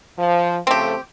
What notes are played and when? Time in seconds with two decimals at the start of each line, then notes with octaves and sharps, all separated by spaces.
0.18 F3
0.67 C#3 F3 A3 C4 G4